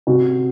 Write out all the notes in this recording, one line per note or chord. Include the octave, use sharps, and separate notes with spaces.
C3 F#4